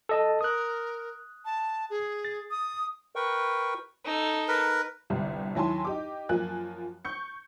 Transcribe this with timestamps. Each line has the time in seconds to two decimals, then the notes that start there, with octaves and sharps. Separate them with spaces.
0.09 A4 D#5 A5
0.41 A#4 D#6 F#6
1.45 A5
1.90 G#4
2.25 A6
2.51 D#6
3.16 A#4 B4 G5 C#6
4.05 D#4 A4
4.48 A#4 B4
5.10 G1 C2 G4
5.55 D#2 F#3 E4 G#5 A5 C6
5.85 D#4 G4 D6
6.29 F#2 F3 A#3 G#5 F#6
7.05 C#6 G6 C#7